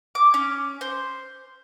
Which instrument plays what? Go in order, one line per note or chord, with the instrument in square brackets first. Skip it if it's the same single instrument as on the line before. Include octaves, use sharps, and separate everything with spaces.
[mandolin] D6
C#4
C5